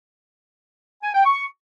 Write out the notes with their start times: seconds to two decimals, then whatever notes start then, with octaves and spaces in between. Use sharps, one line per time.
1.02 G#5
1.13 G5
1.25 C#6